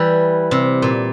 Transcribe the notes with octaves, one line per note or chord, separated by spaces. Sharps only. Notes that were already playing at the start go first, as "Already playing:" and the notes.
Already playing: E3 G3
C3
A#2